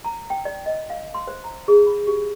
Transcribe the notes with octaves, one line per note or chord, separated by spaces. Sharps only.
A#5
G5
D5
D#5
F5
C6
C5
A#5
G#4
B5
G4